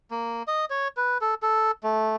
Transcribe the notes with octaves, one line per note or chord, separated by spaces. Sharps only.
A#3
D#5
C#5
B4
A4
A4
A3